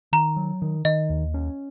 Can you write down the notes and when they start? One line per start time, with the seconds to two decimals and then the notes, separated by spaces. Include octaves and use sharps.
0.13 D#3 A#5
0.36 F#3
0.62 D#3
0.85 D#3 D#5
1.10 D#2
1.34 C#4